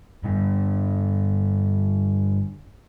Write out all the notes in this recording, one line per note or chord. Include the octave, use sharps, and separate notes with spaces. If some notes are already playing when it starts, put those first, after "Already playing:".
G2 D3